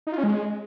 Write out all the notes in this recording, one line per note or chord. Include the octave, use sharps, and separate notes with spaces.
D#4
F4
C#4
G#3